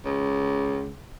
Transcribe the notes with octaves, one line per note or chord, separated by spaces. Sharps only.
C#2